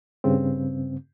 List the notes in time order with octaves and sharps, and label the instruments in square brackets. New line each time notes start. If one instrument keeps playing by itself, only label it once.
[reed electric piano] G2 C#3 C4